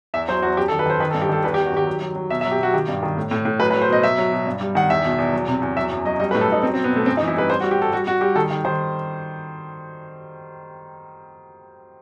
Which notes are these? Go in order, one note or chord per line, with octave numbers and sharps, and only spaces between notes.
E2 E5
F#3 C5
E2 F#4
F#2 G4
A4
D#3
B4
D#3 C5
D#3 B4
A4
G2
G4
D#3 A4
E2 B4
G4
E2
F#4
D#3 G4
F#3
F#3
F#3
B2 E5
E5
F#3
G4
B2 F#4
D#3 G4
G2
D#3
A2
A2
A2
F#3 B4
B4
F#3
C5
B2 D#5
F#3 E5
F#3
B2
G2
G3
D#3 F#5
E2 E5
B2
E2
F#3
C3
E2
F#3 E5
F#2
F#3 D#5
G3 D#5
B4
A2
A4
A2 D#4
F#3 C4
C4
B2
B3
B2 A3
F#2 C4
D#4
E3
E4
G3 B4
G3 C5
F#4
G3
G4
G3 A4
G3 F#4
G3 F#4
G3 G4
D#3 A4
D#3
D#3 C5